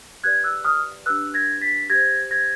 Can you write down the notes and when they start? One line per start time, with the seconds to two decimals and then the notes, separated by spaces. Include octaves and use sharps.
0.24 G4 B4 D5 F#6 G#6
0.44 E6 F#6
0.65 D#6 F6
1.06 D4 G4 B4 E6 F#6
1.34 G#6 A#6
1.61 A6 B6
1.89 G4 C5 G#6 A#6
2.31 G#6 A#6